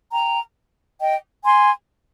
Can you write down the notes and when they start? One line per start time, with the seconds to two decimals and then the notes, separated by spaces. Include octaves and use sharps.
0.11 G5 A#5
1.01 D#5 G5
1.44 G#5 C6